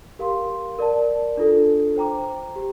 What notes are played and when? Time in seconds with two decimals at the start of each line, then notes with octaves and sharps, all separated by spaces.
0.19 G4 A#4 F5 C6
0.79 A#4 D5 A5
1.37 D4 F4 A4
1.96 C5 G5 A#5 D6
2.56 G4